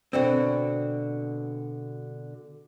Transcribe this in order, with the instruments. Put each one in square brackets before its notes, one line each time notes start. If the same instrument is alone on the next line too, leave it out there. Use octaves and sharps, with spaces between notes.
[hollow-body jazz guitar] B2 D3 C4